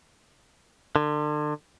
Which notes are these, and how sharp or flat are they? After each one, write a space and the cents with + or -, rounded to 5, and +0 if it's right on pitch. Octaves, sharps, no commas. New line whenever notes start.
D3 +35